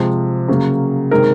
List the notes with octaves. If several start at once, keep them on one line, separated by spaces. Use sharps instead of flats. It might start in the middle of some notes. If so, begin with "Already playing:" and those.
Already playing: C3 F3 G#3
C#3 F#3 A#3
C3 D#3 G#3 A#4